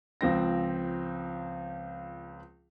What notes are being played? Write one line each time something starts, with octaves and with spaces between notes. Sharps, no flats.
C#2 F3 C4 A#6